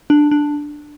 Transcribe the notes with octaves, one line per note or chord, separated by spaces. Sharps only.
D4
D4